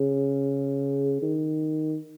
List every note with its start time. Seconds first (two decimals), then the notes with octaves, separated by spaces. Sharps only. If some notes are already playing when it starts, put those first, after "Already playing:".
Already playing: C#3
1.22 D#3